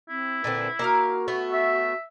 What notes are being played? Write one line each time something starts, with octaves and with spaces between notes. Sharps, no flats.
C4 E4
A#2 D3 C4 B4
A#3 F#4 A#4 F5
A3 B3
E5